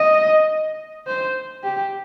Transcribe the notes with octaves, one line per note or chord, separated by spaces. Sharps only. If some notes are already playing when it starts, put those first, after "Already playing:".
Already playing: D#5
C5
G4